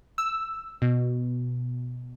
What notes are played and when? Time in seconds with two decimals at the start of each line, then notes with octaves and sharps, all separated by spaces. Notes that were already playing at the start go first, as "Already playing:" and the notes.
0.18 E6
0.82 B2